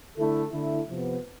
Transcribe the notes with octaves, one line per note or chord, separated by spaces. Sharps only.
D3 A3 E4 A4
D3 A3 E4
C3 F3 B3